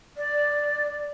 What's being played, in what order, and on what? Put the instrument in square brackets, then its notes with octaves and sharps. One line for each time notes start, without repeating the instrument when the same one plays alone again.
[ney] D5